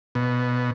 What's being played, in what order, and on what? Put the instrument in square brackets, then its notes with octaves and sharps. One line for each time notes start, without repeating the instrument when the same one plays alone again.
[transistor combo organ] B2